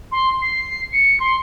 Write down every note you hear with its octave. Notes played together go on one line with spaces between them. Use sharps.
C6
C7
C#7
C6